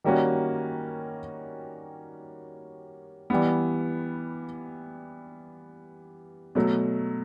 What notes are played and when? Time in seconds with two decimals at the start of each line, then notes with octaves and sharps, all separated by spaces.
0.04 D#3 G3 A#3 C#4 F#4
3.30 E3 G3 B3
6.55 B2 F#3 A3